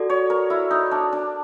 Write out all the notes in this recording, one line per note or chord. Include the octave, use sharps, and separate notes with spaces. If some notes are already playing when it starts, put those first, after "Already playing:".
Already playing: F#4 A4 D5
C#5
A#4
E4
D#4
D4
D4